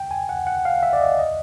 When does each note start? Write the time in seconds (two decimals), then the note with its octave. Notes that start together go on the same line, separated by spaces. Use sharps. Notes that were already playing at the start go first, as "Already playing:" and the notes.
Already playing: G5
0.11 G#5
0.29 F#5
0.47 F#5
0.65 F5
0.83 E5
0.93 D5
1.01 D#5
1.19 D#5